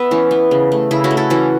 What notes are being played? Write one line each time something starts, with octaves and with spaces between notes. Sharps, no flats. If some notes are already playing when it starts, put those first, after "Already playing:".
Already playing: B3 B4 E5
E3 C#4
B3
C#3
A3
C#3 E4
C#4 F#4
A3
E4 A4
E3 C#4 F#4